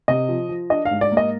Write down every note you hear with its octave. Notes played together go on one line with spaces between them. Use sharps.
C3 D#5
F3
F3
D4 D#5
F5
G#2
D5
A#3
D#5